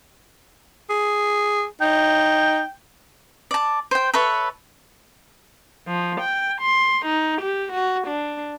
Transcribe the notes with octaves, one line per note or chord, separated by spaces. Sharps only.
G#4
D#4 G5
D5 A5
C5 G5
A4 B4 C#5 E5
F3
G5
C6
D#4
G4
F#4
D4